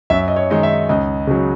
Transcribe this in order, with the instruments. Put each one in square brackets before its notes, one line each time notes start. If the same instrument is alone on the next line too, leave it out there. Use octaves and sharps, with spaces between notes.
[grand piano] F#2 E5
D#5
C#5
D#3 G#3 D#4 D#5
E5
C#2 D#5
C#3 F#3